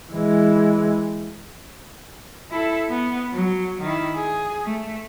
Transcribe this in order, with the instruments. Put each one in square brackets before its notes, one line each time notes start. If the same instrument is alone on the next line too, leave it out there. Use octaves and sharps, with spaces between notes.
[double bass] E3 G#3
[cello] E4 A4
B3
F#3
D#3 E4
G#4
A3